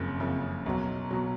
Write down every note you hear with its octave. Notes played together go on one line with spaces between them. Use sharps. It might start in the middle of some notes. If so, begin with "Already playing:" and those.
Already playing: F#1 F2 C#3
F#1 F2 C#3
B1 B2 F#3
B2 F#3